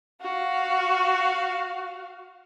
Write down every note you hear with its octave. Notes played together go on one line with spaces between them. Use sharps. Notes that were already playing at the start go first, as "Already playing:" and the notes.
F#4 F5